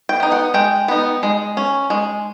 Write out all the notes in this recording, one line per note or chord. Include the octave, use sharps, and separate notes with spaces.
G5
B3 D#4
F#5
G#3 G5
B3 D#4
G#3
C#4
G#3